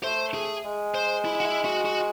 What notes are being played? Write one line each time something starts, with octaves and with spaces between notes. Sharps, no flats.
A3 C5
G#4
G#3
C5
E4
F#4
E4
F#4
F#4